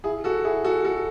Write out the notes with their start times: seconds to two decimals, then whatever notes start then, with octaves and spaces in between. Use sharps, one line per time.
0.04 E4 G#4
0.24 F#4 A4
0.45 E4 G#4
0.64 F#4 A4
0.85 F#4 A4